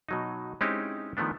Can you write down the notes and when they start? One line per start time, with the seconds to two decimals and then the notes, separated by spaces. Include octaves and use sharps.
0.09 B2 F#3 D#4
0.61 G#3 C4 C#4 D#4 E4 G4
1.17 D#3 F3 A3 B3 D4